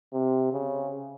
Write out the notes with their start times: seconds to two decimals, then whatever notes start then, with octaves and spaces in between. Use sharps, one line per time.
0.13 C3
0.53 C#3